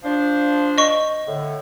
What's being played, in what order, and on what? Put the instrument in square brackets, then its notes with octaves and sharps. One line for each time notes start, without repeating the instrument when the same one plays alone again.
[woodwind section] F3 D4 C5
[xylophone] D#5 C#6
[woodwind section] A2 D3